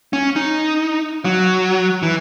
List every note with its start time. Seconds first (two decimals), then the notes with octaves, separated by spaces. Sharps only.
0.13 C#4
0.36 D#4
1.25 F#3
2.03 E3